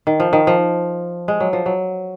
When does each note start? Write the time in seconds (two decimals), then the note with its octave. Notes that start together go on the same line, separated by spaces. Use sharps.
0.07 D#3
0.20 F3
0.33 D#3
0.47 F3
1.28 G#3
1.40 F#3
1.53 F3
1.66 F#3